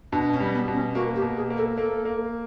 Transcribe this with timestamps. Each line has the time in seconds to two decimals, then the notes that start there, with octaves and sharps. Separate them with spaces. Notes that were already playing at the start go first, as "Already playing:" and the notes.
0.12 B2 D4
0.33 C#4
0.40 G3
0.54 B3
0.68 B2
0.74 C#4
0.95 A#3 F#4
1.15 G4
1.22 B2
1.37 G#4
1.50 A#3
1.57 A4
1.77 A#3 A4
2.05 A#3